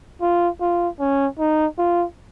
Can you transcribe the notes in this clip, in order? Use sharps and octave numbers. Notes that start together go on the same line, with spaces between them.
F4
F4
C#4
D#4
F4